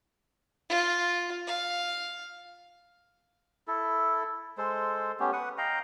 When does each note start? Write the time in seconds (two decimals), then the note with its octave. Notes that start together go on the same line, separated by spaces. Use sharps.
0.70 F4
1.47 F5
3.68 E4 A4
4.58 G#3 A4 C5
5.20 A3 B3 C#4 G4
5.33 B4 F#5 C#6 D#6
5.58 D#5 F5 G5 A#5